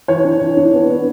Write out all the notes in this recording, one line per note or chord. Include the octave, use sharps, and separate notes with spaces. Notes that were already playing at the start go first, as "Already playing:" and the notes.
E3 C#5
D4
E3
D4
B3
B3